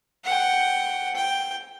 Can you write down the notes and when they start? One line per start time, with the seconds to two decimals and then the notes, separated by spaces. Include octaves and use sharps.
0.25 F#5 G5
1.15 G5